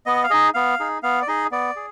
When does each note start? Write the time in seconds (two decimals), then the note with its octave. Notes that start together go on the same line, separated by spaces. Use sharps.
0.06 B3 D#5
0.24 F5
0.30 D#4 G#4 D#5
0.54 B3 F5
0.80 D#4 G#4
1.03 B3 F5
1.22 D5
1.28 D#4 G#4 D#5
1.51 B3 D5
1.76 G#4